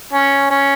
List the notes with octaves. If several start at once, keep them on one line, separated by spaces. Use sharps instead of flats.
C#4
C#4